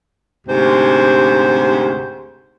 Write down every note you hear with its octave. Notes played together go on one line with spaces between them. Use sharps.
D2 G#2 C3 G4 C5